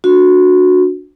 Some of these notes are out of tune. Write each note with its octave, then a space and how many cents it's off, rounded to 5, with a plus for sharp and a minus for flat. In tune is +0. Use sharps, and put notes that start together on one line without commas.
D4 +0 F#4 -20